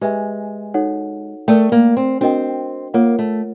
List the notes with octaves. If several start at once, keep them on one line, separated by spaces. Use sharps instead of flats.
G#3 G4 B4 E5 G#5
D#4 F#4 A4 C#5 F#5
A3 A#4 D5 G5
A#3
C4
C4 D4 F#4 A#4 D#5 G5
A#3 F4 A#4 C#5 F#5
A3